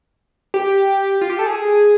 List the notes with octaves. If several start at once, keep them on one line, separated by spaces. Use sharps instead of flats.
G4
F4
G4
A4
G#4